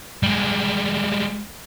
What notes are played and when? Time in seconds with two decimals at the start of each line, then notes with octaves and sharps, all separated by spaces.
0.23 G3 G#3